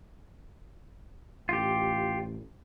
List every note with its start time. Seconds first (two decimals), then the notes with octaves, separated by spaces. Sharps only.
1.49 A1 F4 G4